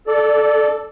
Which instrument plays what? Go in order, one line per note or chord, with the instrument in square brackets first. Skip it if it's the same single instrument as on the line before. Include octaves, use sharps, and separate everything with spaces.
[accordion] A4 D5